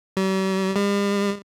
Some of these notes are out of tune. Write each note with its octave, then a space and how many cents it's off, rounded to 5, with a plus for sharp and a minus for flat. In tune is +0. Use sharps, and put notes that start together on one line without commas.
G3 -45
G3 +45